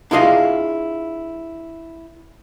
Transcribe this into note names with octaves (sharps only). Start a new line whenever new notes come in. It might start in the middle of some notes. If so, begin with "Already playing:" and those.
D4 E4 F4 G#4 D#5 F5